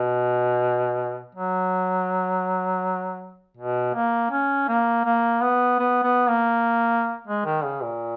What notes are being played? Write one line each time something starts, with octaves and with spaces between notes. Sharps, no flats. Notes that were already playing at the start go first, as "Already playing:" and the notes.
Already playing: B2
F#3
B2
A#3
C#4
A#3
A#3
B3
B3
B3
A#3
G#3
D#3
C#3
A#2